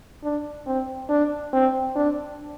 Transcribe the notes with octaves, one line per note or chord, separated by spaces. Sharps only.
D4
C4
D4
C4
D4